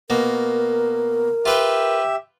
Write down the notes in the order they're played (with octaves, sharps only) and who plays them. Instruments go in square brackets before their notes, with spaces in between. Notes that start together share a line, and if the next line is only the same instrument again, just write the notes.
[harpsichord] B2 A#3 [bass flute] A#4
[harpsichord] F4 B4 G5 [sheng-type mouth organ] G4 E5